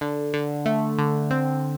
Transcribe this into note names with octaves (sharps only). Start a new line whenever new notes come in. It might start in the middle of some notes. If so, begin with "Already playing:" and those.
D3
D3
A3
D3
C4